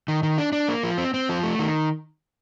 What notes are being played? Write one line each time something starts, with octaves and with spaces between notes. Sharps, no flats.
D#3
D#3
D4
D4
A#3
F3
C4
C4
F3
A3
D#3